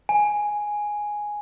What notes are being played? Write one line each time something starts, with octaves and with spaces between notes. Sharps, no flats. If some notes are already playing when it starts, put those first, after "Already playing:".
G#5